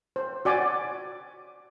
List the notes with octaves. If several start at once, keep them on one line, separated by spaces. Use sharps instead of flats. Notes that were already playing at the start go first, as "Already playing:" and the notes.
C5
F#4 D5 G#5 D6